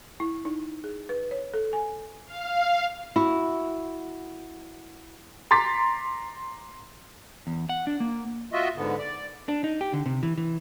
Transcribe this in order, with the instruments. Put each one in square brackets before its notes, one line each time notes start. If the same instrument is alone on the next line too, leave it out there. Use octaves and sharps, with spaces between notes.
[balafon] E4
D#4
G#4
B4
C#5
A4
G#5
[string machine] F5
[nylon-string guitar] E4 F#4
[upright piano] A#5 C6 D6 A6 B6
[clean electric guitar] E2
F#5
D4
A#3
[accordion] F4 F#4 D#5 E5
G#2 D3 B3
D5
[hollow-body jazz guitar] D4
D#4
G4
D3
C3
E3
E3